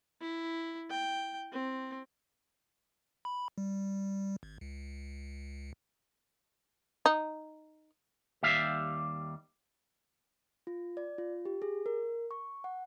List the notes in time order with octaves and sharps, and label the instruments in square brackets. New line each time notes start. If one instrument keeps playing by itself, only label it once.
[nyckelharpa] E4
G5
C4
[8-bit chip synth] B5
G3
G#1
C#2
[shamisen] D#4
[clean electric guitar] D#2 G3 E5 F5
[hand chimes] F4
D5
F4
G4
G#4
A#4
C#6
F#5